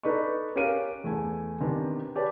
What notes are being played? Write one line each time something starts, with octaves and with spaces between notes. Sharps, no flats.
D#4 A4 B4 D5 D#5 C#6
C#4 G4 A#4 F5 D7 D#7
E2 A3 G#5
C3 D#3 B3 D4
G4 B4 C#5 D5 A5